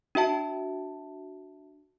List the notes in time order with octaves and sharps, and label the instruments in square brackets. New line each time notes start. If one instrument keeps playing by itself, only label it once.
[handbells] D4 F#4 E5 A5